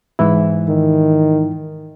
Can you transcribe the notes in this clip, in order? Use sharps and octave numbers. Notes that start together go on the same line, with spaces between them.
G#2 E3 E4
D#3